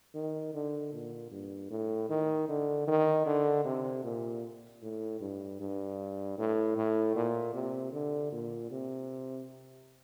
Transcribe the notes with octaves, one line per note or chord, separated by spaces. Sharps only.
D#3
D3
A#2
G2
A2
D#3
D3
D#3
D3
C3
A#2
A2
G2
G2
A2
A2
A#2
C3
D3
A#2
C3